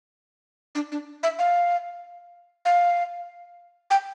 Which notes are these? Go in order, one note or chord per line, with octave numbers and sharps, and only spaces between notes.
D4
D4
E5
F5
F5
G5